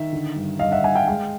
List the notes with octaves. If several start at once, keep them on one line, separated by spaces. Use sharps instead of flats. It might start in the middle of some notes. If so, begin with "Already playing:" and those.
Already playing: D#3 E5
D3
G2
G2 D#5 F5
E5 F#5
G2 F#5 G#5
F5 G5
G#3 F5 G5